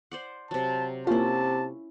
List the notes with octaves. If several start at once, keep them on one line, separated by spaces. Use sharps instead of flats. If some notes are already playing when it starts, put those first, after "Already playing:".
C5 D5 F#5
C3 F#3 A5
C3 A#3 C#4 E4 F4 A5